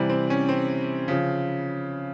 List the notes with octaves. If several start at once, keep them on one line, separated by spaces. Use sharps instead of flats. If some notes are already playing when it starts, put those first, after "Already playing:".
Already playing: C3 E3 G3
C4
C#4
C4
C#3 F3